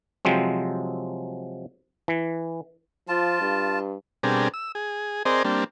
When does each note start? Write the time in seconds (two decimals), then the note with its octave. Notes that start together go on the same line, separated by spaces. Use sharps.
0.25 C3 F3 F#3 G#3 C4
2.08 E3
3.08 F3 F4 A5
3.41 G2
4.23 B2 G3 C4 D4 G#4 A#4
4.54 E6
4.75 G#4
5.25 C4 G#4 A#4 C5 D5 D#5
5.44 G3 A#3 C4 D4